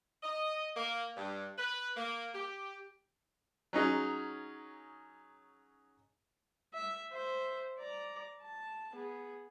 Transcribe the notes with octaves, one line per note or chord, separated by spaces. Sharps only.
D#5
A#3
G2
B4
A#3
G4
F#3 C#4 D#4 G#4
E5
C5 E5
D5 A#5
A5
B3 G#4